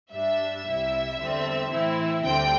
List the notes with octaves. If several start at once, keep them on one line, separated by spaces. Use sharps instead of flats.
G2 G3 D4 E5
C2 C3 G3 E4
E2 D3 G3 C4
A2 E3 C4 E4
D2 D3 G3 C4 G5